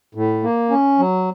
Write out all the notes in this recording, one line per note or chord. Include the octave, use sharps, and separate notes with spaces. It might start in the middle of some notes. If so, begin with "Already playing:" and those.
A2
A#3
C#4
F#3